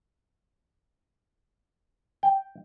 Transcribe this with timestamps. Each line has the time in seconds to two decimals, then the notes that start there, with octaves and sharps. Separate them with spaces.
2.23 G5